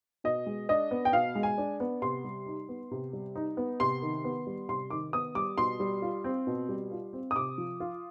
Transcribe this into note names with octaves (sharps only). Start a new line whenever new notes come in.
B2 D#5
G#3
D4 D#5
B3
G5
B2 F5
G#3
G#5
D4
B3
C3 C6
G3
D#4
B3
C3
G3
D#4
B3
C3 C6
D#3
B3
G3
C3 C6
D#3 D6
B3 D#6
G3 D6
B2 C6
G3
F4
C4
B2
G3
F4
C4
D#6
C3 D6
F3
F4